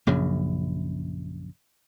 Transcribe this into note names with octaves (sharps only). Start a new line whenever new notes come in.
A#1 F#2 C#3 F#3